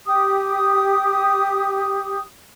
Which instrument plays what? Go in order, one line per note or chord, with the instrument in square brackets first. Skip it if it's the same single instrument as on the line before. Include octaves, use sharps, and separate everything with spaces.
[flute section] G4 D#6